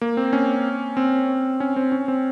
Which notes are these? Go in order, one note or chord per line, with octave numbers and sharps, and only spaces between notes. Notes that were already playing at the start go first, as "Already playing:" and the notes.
A#3
C4
C#4
C4
C#4
C4
C#4
C4